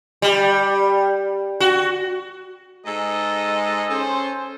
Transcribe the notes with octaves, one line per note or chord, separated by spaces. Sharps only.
G3
F#4
G#2 G#3 A4 D#5
C#4 A4 C5